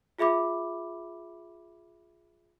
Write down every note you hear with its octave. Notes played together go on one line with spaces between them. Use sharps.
F4 G#4 E5 B5 D6